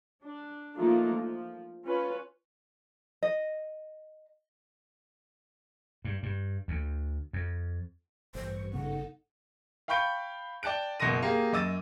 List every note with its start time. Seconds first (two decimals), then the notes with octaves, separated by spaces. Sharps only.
0.23 D4
0.76 F3 A3 A#3 D4 D#4 F4
1.13 F3
1.85 C#4 F4 B4
3.23 D#5
6.05 G2
6.23 G2
6.68 D2
7.33 F2
8.35 A1 G2 C5 C#6
8.73 G#1 C#3 B3 D#4 A4 F#5
9.88 F5 G5 B5 C#6 G6 D7
10.63 D5 G5 A5 F#6 D7
11.00 F#1 B2 C6 A#6 D#7
11.22 A#3 G4 G#4
11.52 F#2 D#5 D6 E6 A6 D#7